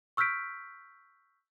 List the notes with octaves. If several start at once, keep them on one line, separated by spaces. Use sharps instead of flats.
C#6 E6 F6 G6 B6 D7